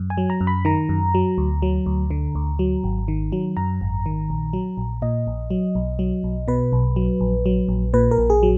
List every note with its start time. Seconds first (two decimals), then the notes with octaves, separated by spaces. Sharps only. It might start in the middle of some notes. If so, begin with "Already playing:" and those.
Already playing: F#2
0.10 G#5
0.18 F#3
0.30 A#5
0.41 F#2
0.47 B5
0.65 D#3 A#5
0.89 F#2
1.15 F#3
1.38 D2
1.62 F#3
1.86 D2
2.10 D3
2.35 D2
2.59 F#3
2.84 G#1
3.08 D#3
3.32 F#3
3.57 F#2 A#5
3.81 G#1
4.06 D#3
4.30 A#1
4.53 F#3
4.77 A#1
5.02 A#2 D#5
5.27 A#1
5.50 F#3
5.75 B1
5.99 F#3
6.24 B1
6.48 B2 B4
6.73 B1
6.96 F#3
7.20 A#1
7.46 F#3
7.69 A#1
7.94 A#2 B4
8.11 A#4
8.18 A#1
8.30 G#4
8.43 F#3